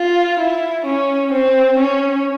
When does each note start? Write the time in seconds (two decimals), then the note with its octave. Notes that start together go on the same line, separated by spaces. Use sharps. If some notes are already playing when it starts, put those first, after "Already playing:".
Already playing: F4
0.40 E4
0.86 C#4
1.33 C4
1.78 C#4